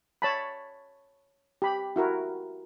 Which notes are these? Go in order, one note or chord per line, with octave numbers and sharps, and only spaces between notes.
C#5 A5 B5
G4 B5
E4 F#4 A#4